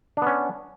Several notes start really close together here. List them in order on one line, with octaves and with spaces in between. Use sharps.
D4 B3 C#4